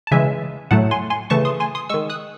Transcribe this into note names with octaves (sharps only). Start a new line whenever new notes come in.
A5
C#3 E3 G#3 E5 G#5
A2 F#3 A3 F#5 A5
G#5 C6
G#5 C6
C#3 E3 A3 A5 C#6
C6 D#6
G#5 C6
C6 D#6
D#3 G#3 C#6 E6
D#6 F#6